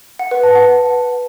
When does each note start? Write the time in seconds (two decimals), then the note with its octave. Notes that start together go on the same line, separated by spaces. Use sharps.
0.19 F#5
0.31 B4
0.43 A5
0.55 F#5